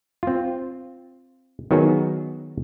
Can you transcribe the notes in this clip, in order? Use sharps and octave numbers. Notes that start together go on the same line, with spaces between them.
C4 F4
D#3 F#3 B3 D#4 F#4 G#4